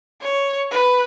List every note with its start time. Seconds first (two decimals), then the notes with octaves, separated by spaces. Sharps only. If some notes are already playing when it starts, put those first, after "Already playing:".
0.21 C#5
0.72 B4